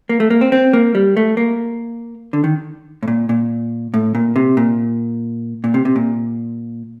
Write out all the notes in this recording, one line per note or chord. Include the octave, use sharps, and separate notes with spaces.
A#3
A3
A#3
C4
C4
A#3
G3
A3
A#3
D3
D#3
A2
A#2
A#2
A2
A#2
C3
A#2
A#2
C3
C3
A#2